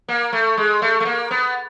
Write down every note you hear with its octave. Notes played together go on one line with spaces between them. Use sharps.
A#3
A3
G#3
A3
A3
A#3
B3